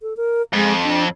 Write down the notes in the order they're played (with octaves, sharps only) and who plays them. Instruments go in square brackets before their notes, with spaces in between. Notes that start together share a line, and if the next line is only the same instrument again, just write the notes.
[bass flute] A4
A#4
[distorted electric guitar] F2 [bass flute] G#3
[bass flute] D4